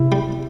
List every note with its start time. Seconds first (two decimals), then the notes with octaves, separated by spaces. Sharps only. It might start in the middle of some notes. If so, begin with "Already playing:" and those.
Already playing: C3 E4
0.12 G3